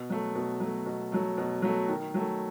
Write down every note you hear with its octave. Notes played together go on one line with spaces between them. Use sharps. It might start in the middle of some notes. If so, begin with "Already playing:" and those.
Already playing: B2
F#3 A3
B2
F#3 A3
B2
F#3 A3
B2
F#3 A3
D#3
F#3 A3